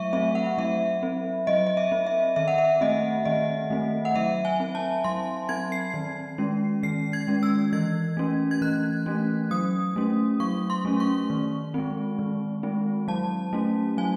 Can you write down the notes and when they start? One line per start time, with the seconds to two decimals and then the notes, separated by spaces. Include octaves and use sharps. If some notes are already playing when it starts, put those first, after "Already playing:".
Already playing: F#3 A3 E5 C#6
0.13 A3 C4 E5
0.35 F#5
0.58 F#3 E5
1.03 C4
1.47 F#3 D#5
1.67 D#5
1.77 E5
1.92 C4
2.07 E5
2.36 D#3 E5
2.48 F#5
2.58 E5
2.81 A3 C4 D#5
3.25 D#3 D#5
3.71 A3 C4
4.05 F#5
4.16 F#3 E5
4.45 G#5
4.60 C4
4.75 A5
5.04 F#3 C6
5.49 C4 G#6
5.72 C7
5.94 D#3
6.38 G#3 C#4
6.83 D#3 C7
7.13 G#6
7.27 G#3 C#4
7.43 E6
7.73 E3 G#6
8.17 A3 C#4
8.51 G#6
8.62 E3 F#6
9.06 A3 C#4
9.51 F#3 D#6
9.96 A3 C#4
10.40 F#3 C#6
10.70 C6
10.85 A3 C#4
11.00 C#6
11.30 D#3
11.74 G#3 C4
12.19 D#3
12.63 G#3 C4
13.08 F#3 A5
13.53 A3 C#4
13.97 F#3 G#5